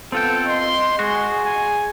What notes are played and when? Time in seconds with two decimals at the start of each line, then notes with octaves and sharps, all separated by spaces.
0.12 B3 C4 F4 A4 G5
0.47 D#5 C6
0.99 G#3 F#4 G#4
1.44 G#5